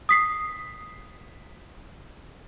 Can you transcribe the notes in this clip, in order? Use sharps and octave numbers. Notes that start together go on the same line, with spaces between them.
D#6 B6 C7